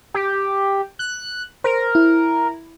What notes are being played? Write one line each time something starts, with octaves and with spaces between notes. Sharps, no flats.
G4
F#6
A#4 C5
E4